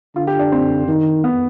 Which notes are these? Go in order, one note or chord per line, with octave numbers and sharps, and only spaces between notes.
D3 F4
G4
D4
C4
D#3
B3